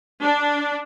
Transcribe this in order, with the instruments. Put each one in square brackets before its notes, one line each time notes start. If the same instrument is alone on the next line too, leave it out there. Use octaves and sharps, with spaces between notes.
[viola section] D4